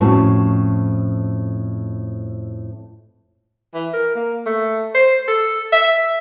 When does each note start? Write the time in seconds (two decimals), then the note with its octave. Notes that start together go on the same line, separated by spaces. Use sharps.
0.01 F2 A2 C#4 E4 F#4 A5
3.74 E3
3.94 A#4
4.16 A#3
4.46 A3
4.95 C5
5.28 A4
5.73 E5